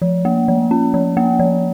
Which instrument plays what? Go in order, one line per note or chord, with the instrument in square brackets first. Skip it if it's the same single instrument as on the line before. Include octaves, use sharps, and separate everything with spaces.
[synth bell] F3
A#3
F3
C#4
F3
A#3
F3